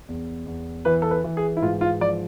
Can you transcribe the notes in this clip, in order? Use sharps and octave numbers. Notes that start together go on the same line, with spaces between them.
E2
E2
E3 B4
A4
B4
E3
G#4
E4
G#2 F4
F4
F3 D5